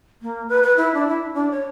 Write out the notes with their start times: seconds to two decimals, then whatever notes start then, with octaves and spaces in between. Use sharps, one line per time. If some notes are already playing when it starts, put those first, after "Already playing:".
0.22 A#3
0.49 B4
0.63 B4
0.77 E4
0.94 D4
1.08 E4
1.34 D4
1.51 C#5